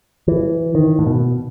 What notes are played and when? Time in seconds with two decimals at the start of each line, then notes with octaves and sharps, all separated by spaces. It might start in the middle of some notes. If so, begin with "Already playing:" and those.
0.28 E3
0.75 D#3
0.99 A2
1.07 B2